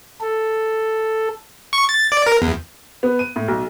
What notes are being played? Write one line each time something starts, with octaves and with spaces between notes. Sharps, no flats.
A4
C#6
A6
D5
A#4
E2
B3
D#7
A2
B1